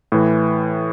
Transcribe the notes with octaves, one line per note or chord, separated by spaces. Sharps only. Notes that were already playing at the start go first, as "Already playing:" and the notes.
A2 E3